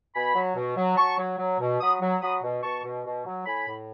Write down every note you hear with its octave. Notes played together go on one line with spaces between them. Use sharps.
B2 G#5 B5
F#3
B2
F#3
F#3 A5 C#6
F#3
F#3
B2
F#3 B5 D#6
F#3
F#3 B5 D#6
B2
B2 A5 C#6
B2
B2
F#3
A2 G#5 B5
A2